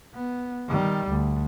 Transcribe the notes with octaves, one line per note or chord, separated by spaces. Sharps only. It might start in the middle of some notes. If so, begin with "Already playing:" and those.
B3
D#3 G3
D2